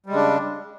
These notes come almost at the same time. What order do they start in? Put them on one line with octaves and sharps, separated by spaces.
G3 G#3 C#3 D4